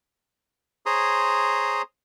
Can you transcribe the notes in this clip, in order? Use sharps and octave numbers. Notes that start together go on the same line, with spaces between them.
G#4 C5 C#5 A#5 C6 D#6